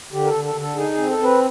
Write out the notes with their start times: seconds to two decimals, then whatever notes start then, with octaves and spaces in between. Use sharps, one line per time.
0.12 D3 G4
0.24 A#4
0.28 A4
0.34 D3
0.45 A4
0.55 D3
0.61 A4
0.76 D#4 G#4
0.92 G#4
0.97 C4
1.08 A4
1.18 C4
1.23 B4